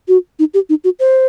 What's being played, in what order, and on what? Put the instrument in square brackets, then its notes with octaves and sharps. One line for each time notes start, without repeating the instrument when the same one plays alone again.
[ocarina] F#4
D#4
G4
D#4
F#4
C5